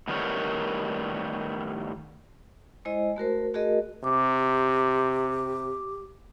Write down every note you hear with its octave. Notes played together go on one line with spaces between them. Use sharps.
A2 D#3 G3 B3 A#4 C#5
G#3 E4 C5 D#5
A3 F#4 A#4 C5
A3 F#4 G#4 A#4 D#5
C3 G4 D6